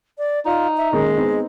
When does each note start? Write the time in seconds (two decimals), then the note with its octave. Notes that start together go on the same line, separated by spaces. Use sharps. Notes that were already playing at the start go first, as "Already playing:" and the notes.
0.18 D5
0.45 D#4 F4 D5
0.77 E5
0.93 D#3 G#3 A#3 C#4
1.17 B3 C4 D#4